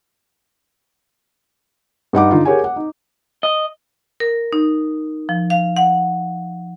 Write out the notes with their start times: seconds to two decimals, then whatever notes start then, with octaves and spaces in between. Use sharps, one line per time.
2.13 G2 D#4 F#5 D6
2.31 D3 D#4 F4
2.45 G4 G#4 A#4 C#5 F#5 G#5
2.64 F#5
2.76 D#4
3.43 D#5
4.20 A#4
4.53 D#4
5.29 F3
5.50 F5
5.76 F#5